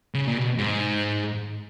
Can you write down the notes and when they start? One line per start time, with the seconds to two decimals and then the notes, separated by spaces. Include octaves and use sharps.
0.14 C#3
0.28 A#2
0.38 B2
0.58 G#2